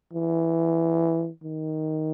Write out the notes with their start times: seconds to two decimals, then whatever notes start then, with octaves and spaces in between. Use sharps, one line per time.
0.13 E3
1.43 D#3